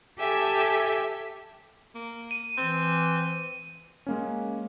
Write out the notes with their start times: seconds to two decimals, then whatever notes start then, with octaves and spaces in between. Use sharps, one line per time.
0.17 G4 A4 E5 G#5
1.95 A#3
2.31 D#7
2.58 E3 C4
4.07 G#3 A#3 C#4